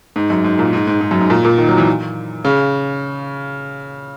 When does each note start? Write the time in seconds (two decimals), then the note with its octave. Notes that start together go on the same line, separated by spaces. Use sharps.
0.16 G#2
0.30 F#2
0.44 G#2
0.59 A#2
0.73 G#2
0.87 G#2
1.01 G#2
1.11 F#2
1.21 G#2
1.30 A#2
1.45 A#2
1.58 D#3
1.69 F#3
1.78 E3
2.45 C#3